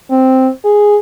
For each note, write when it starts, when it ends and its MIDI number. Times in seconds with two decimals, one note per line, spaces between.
0.10 0.48 60
0.64 0.99 68